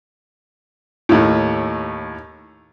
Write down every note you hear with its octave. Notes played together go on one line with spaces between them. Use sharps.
D#2 A2